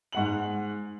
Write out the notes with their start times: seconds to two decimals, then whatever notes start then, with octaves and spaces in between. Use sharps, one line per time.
0.12 G#2 F#5 F#7